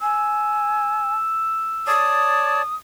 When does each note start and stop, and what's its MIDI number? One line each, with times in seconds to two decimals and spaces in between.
0.01 1.14 80
0.01 1.97 88
1.87 2.62 73
1.87 2.62 74
1.87 2.62 81
1.87 2.75 87